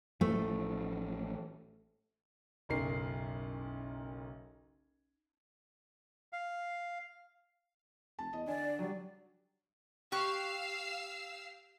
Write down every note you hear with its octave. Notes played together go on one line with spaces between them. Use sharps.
A1 E3 F3 A3
F#1 B1 A#4 C7
F5
F1 A5
E2 D#5
D3 D5 G#5
F#3 G3
G4 F5 C#6 E6 F#6 C7